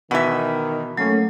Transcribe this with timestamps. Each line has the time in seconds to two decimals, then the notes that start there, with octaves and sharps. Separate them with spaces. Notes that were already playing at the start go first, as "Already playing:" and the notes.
0.11 B2 D#3 E3 B3 E5
0.97 F#3 A3 A#3 C#4 A4